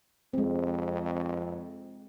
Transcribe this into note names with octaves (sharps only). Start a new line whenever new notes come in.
F2 G#3 C4